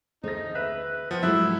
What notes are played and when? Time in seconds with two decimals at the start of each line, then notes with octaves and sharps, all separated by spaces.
0.23 D2 A3 D#4 G#4 C5 A#6
0.55 B4 E5
0.75 B4
1.11 F3 B3 B4 F#5 G5
1.23 G#2 F#3 G#3 A3 E4 B4 E5 F#6